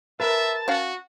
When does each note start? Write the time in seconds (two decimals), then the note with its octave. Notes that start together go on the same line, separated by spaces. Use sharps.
0.20 A#4 B4 E5 A5
0.68 C#4 F#4 C#5 F5